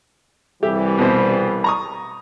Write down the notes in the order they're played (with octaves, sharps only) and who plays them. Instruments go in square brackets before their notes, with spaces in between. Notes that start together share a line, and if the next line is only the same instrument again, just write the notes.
[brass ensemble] C2 E3 G3 [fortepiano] G4 E5
[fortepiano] B2 C4
A#5 C#6 D#6